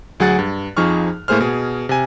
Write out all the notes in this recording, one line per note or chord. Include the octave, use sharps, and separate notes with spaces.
D2 F#3 G#4 F#5 F#6 A6
G2
F2 F3 D#4 G#4 C#6 F6
A2 A3 A#3 G#4 C5 F6
B2 G#4
C3 G#5